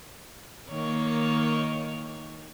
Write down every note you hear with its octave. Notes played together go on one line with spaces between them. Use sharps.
D#3 A#3 C#5